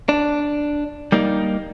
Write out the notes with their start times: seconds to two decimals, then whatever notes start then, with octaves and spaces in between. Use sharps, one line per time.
0.09 D4
1.12 G3 A#3 D#4 D5